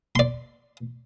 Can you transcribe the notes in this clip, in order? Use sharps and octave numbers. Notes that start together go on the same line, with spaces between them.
D5 C6